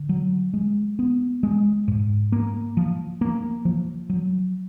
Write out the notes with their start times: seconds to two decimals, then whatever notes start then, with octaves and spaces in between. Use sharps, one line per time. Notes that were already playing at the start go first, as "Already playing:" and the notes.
Already playing: D3
0.09 F#3
0.54 G#3
0.99 B3
1.43 G#3
1.88 G#2
2.32 A#3
2.77 F3
3.21 A#3
3.65 F3
4.10 F#3